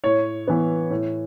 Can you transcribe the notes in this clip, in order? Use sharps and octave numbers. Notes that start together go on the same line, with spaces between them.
A2 C#5
E3 B3
A2